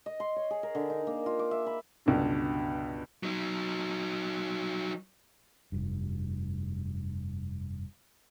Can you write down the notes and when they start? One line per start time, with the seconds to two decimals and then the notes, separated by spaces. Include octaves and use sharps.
0.06 D#5
0.20 C6
0.36 C#5
0.50 G#4
0.63 A#4
0.75 D3
0.90 D#4
1.07 A#3
1.26 F4
1.39 D6
1.51 E5
1.66 B5
2.06 C#2 G2 B2 D3
3.23 F#3 D#4
5.72 F1 G2